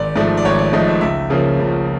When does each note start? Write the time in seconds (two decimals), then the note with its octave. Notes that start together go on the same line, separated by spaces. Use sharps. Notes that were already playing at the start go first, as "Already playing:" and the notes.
Already playing: G#1 D5
0.16 G#2 F3 A3 D5
0.37 D5
0.45 G#1 C#5
0.58 D5
0.73 G#2 F3 A3 D#5
0.88 E5
1.01 C#2 E5
1.30 C#3 F3 A#3 C#4
1.59 C#2